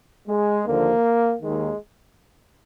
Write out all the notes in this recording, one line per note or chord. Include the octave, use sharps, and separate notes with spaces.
G#3
D#2 D3 F3 A#3
D#2 D#3 G#3